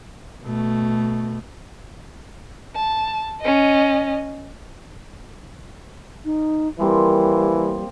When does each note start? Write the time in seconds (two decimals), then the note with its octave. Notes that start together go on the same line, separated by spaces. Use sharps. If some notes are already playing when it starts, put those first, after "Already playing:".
0.43 B2 A3
2.75 A5
3.41 C#4 D#5
6.25 D#4
6.79 E3 F3 G3 A#3 C4